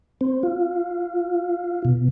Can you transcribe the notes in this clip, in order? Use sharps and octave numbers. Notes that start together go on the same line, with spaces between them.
C4
F4
B2